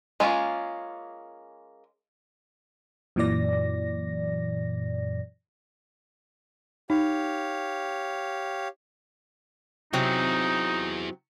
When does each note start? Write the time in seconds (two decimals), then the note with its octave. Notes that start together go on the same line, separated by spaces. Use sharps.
0.20 G#3 A#3 C#4 F4
3.16 F#2 A#2 E3 F#3 D5 A#6
6.90 D#4 G4 C#5 F5
9.93 C3 F#3 C4 D#4 E4 G#4